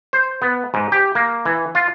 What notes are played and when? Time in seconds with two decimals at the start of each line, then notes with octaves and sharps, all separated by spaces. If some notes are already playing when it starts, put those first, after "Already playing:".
0.13 C5
0.42 B3
0.74 G#2
0.92 G4
1.15 A#3
1.45 E3
1.75 F4